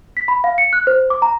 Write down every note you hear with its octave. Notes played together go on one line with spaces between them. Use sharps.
B6
B5
F5
C#7
F#6
C5
D6
A#5